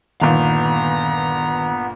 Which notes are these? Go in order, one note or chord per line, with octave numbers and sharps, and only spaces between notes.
G1 A#2 D#3 B3 A#5